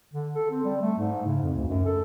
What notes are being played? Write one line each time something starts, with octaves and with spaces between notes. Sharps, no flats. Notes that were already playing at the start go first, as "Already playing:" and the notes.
D3
A4
C4
G3
A3
G#2
C#3
F2
D2
F#2
A4